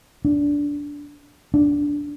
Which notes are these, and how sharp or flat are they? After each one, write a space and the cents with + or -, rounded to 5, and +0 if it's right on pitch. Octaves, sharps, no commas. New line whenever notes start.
D4 -15
D4 -10